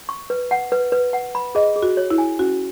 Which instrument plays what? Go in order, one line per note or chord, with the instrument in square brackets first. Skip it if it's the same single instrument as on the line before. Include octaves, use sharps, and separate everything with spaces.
[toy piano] C#6
B4
F#5
B4
B4
F#5
B5
[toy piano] G#4 [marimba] D#5
[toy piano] G#4
[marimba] F#4
[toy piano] C#5
[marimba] E4
[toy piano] G#5
[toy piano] C#4 [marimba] F#4